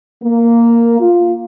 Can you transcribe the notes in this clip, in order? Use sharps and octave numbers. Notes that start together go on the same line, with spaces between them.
A#3
F4